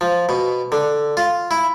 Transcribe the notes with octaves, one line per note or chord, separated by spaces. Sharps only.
F3
B2
D3
F4
E4